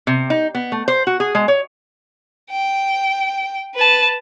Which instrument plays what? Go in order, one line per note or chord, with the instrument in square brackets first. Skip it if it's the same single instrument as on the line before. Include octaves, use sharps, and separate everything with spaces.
[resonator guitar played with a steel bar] C3
D#4
B3
A3
C5
F#4
G#4
G#3
C#5
[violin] G5
B4 A5